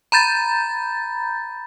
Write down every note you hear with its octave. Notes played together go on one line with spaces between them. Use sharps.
A#5 B5 G6 A6